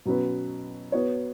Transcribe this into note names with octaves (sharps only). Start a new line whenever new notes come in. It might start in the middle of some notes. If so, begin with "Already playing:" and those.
B2 F#3 C#4 B4
B3 F#4 C#5